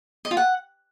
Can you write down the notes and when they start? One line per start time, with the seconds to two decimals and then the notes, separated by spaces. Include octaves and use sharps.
0.25 D#5
0.31 F4
0.37 F#5